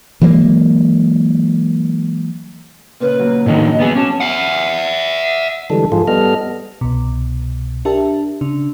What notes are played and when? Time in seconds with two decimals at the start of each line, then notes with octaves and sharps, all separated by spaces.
0.21 E3 F#3 G#3 A#3
3.00 A#2 C#3 B4
3.19 F#3 A#3
3.46 A2 D3 D#3 D#5
3.80 B2 F#3 B3 G#4
3.95 C#4 F#4 A5 D6
4.21 E5 F#5
5.70 D3 E3 G3 G#3 A4
5.92 G#2 F3 F4 G#4 A4
6.08 G3 B3 A4 D#5 F6
6.81 C2 B2
7.85 D4 G4 A#4 E5 A5
8.41 C#3 D4